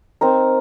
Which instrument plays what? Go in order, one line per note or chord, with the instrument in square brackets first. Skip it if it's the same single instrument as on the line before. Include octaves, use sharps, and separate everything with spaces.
[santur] C4 D#4 A#4